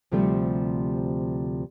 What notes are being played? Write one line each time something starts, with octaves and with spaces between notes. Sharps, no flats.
D2 C3 F3 G3 A3